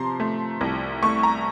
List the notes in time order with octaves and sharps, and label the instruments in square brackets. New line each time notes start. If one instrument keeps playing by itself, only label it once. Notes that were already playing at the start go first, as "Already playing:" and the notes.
Already playing: [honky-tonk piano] C3 F3 A5 A#5 C6
A3
C2
A3 C#6
A#5